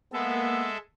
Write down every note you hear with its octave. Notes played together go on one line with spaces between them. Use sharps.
G#3 A#3 B3 A4 E5